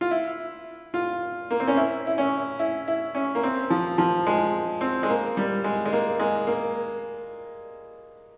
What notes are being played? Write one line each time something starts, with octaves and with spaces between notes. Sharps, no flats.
F4
E4
F4
A#3
C4
C#4
E4
E4
C#4
E4
E4
C#4
A#3
C4
F3
F3
G#3
C4
G#3
A#3
G3
G#3
G#3
A#3
G#3
A#3